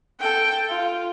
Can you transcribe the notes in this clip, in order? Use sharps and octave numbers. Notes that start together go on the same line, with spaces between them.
A4 G5
F4